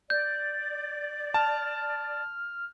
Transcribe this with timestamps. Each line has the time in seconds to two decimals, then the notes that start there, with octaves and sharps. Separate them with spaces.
0.10 D5 G6
1.34 A5 F6